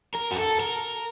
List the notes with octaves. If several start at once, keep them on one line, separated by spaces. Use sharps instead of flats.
A#4
F#4
A4
A#4